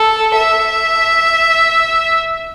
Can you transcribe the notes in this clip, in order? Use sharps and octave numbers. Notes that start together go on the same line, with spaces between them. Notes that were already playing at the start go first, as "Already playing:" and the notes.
Already playing: A4
E5